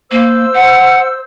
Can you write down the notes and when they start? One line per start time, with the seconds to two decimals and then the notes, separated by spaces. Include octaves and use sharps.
0.11 A#3 C5 E6
0.54 F#5